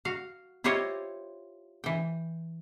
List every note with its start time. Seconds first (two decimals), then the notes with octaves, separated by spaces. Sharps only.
0.05 F#4 F5
0.64 E4 F4 G4 C5 C#5 D#5
1.84 E3 G5